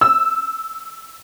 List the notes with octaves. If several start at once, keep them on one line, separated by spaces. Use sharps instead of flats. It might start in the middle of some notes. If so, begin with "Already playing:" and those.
E6